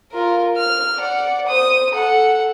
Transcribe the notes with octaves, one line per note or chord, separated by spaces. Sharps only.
F4 A#4
F6
D5 F#5
C5 D#6
A4 F#5